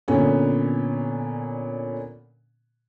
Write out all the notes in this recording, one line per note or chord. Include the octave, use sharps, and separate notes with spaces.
A#2 D3 B3 C#4